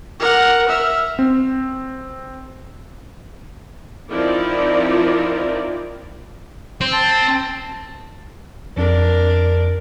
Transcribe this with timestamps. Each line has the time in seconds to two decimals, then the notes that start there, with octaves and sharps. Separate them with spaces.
0.20 A#4 F#5
0.69 E5 F6
1.19 C4
4.10 F3 C4 D#4 E4 A#4 D5
6.81 C4
6.93 A5
8.77 F2 D4 A#4